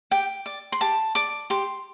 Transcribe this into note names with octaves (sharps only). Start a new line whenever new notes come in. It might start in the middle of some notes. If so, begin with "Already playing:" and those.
G4 G5
D5
C6
G4 A5
D5 D6
G4 C6